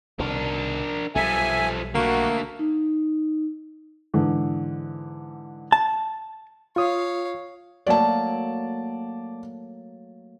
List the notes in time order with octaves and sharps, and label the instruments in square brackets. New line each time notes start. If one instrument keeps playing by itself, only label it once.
[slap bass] C2 B2 D#3 [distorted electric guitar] D4 A#4
[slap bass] B1 G3 [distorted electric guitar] F3 A3 [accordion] E5 G#5
[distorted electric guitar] D3 A3 [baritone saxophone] A#3 [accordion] F#4
[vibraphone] D#4
[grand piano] G#2 D3 E3
[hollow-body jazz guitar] A5
[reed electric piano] F4 D#6 [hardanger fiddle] C#5 F5
[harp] F#3 A3 A#3 [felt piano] D5 A5